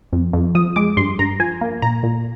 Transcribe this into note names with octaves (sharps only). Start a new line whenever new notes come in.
F2
F2
F3 D#6
G#3 D6
G2 C6
G2 A#5
F3 G#5
A#3
A#2 A#5
A#2